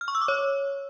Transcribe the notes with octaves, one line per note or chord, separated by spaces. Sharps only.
F6
C#6
E6
D6
C#5